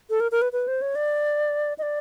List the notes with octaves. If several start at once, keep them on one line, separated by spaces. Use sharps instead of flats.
A4
A#4
A#4
B4
B4
C5
C#5
D5
D#5
D5